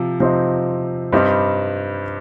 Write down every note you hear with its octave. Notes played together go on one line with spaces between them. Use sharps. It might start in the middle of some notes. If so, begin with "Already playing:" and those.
Already playing: C3 F3
C3 F3 C4 D#4
G2 G3 C4 D#4